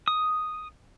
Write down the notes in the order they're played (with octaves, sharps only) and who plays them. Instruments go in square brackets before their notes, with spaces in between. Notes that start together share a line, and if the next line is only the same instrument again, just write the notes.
[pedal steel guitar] D#6